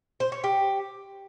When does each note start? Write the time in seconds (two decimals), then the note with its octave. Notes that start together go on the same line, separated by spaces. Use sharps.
0.20 C5
0.32 C#5
0.44 G4